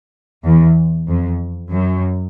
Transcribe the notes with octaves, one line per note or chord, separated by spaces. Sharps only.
E2
F2
F#2